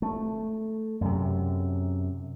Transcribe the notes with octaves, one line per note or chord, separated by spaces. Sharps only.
A3
F#2 C3